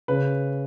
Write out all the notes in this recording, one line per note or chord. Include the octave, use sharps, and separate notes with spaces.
C#3 B4